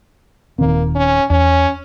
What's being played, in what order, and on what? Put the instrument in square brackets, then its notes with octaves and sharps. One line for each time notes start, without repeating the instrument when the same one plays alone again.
[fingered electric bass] D#1 D#3 C4 [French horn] A#3
[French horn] C#4
[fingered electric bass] E2 [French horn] C#4